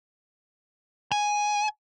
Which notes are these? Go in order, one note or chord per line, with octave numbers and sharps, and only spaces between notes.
G#5